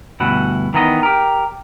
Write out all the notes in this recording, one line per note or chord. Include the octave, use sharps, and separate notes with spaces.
D2 G2 B2 E4 F#5
D#3 E3 B3 D#4 G#4 D#5
G4 A#4